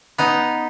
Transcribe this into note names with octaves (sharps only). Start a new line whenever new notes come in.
B3 D#4